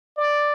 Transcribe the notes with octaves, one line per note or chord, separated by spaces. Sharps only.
D5